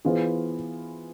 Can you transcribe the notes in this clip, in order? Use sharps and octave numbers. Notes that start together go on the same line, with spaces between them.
E3 B3 F4 G#4 C5